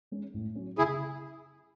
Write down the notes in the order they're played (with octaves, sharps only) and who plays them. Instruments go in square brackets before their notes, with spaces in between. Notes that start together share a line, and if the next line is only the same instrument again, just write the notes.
[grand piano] G#3 C#4
A2
F#3 C#4
[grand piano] C#3 [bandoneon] E4 G#4